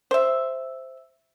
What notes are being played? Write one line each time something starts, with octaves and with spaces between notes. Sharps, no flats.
C5 E5